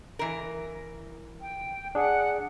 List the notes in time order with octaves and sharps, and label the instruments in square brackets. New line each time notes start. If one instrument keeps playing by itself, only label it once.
[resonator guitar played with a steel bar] E3 A#4
[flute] G5
[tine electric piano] D4 G#4 [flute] F#5